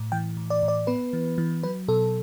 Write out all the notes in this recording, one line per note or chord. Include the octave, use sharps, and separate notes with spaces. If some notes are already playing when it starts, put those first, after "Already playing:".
Already playing: A2
E3 G5
A2
D5
A2
D5
B3 B4
E3
E3
F#3 B4
B2 A4